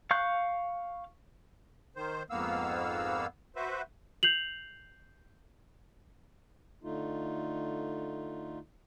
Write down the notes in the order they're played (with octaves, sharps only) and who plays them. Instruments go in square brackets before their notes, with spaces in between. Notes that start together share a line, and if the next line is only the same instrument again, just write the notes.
[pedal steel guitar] F5 C#6 F#6 G6
[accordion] D#3 C5
F2 G#2 A#3 B3 F5 E6
F#4 B4 C5 E5
[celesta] G6 C7 F7 F#7
[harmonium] D3 A3 D#4 F4